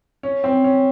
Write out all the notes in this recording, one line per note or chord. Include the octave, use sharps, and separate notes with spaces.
C#4
C4
C#4